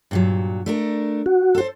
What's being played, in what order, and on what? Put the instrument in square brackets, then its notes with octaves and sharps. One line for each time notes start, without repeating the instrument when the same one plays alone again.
[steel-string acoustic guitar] G2 A#2 F#3
A3 D4 A#4
[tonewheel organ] F#4
[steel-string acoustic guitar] A4 C5